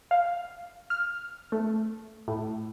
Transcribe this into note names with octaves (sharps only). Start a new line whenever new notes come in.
F5
F6
A3
A2